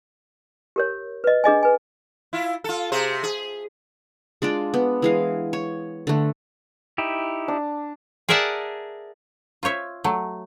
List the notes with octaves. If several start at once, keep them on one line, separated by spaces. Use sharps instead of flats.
G4 A#4 C#5
B4 D#5
D4 G#4 D#5 G#5
B4 G#5
E4 F4
F4 A4
C3 G#4 C5
G#4
G#3 D4 F4 D5
B3
E3 G#3 F5
C#5
D3 A3
D#4 E4 G4
D4
G#4 A#4 D5 E5 F#5 A5
F4 C5 C#5 E5
F#3 A3